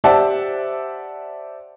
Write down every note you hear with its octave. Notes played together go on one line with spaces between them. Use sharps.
G4 C5 D5 E5 F#5 A5